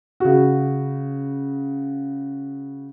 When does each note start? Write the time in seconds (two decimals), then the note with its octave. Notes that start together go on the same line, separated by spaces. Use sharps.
0.20 C#3 F#4